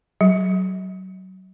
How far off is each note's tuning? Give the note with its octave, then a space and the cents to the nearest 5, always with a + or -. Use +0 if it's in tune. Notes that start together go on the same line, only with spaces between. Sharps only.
F#3 +25